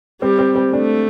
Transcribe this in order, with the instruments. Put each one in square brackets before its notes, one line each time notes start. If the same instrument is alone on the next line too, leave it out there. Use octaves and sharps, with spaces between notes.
[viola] G3 [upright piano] C4
[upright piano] C4
C4
[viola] A3 [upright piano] D4